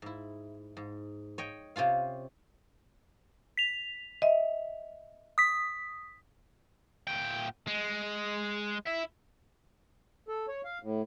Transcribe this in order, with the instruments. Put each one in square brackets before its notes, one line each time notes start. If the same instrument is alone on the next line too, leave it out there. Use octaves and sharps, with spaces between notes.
[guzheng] G#2 E4
G#2
C#5 D#5 G5
C3 C#4 F4 F5
[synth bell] B6 F7
[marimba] D#5 E5
[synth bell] D#6 B6
[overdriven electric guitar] A#2 G5
G#3
E4 E5
[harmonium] A4
C#5
F5
A2